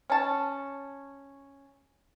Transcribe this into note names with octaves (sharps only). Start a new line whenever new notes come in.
C#4 A5